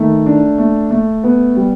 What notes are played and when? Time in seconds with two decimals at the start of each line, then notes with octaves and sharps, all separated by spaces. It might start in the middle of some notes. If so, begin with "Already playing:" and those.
Already playing: D#3 A3
0.26 D4
0.58 A3
0.91 A3
1.24 B3
1.57 G3